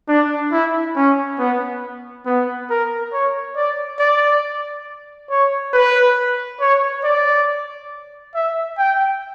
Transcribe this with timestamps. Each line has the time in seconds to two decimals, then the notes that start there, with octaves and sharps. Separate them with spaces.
0.08 D4
0.52 E4
0.96 C#4
1.39 B3
2.26 B3
2.70 A#4
3.13 C#5
3.56 D5
3.99 D5
5.30 C#5
5.73 B4
6.61 C#5
7.04 D5
8.35 E5
8.78 G5